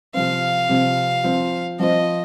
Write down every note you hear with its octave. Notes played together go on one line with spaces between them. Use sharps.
C3 F3 C4 F5
C3 F3 C4
F3 C4 F4 C5
F3 C4 F4 C5 D#5